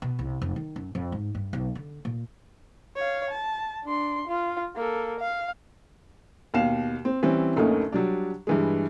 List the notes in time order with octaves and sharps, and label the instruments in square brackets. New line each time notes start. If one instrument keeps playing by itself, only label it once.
[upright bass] B2
C2
F1
D#3
F#2
F2
G#2
G2
B1
D3
A#2
[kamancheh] C#5 F5
A5
D4 C6
F4
A#3 A4
F5
[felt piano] D#2 B2 F5 E7
C4
E3 G3 C4 C#4
F#1 D2 A3 A#3 C#4 D#4
F#3 G3 D4
G2 E3 G#3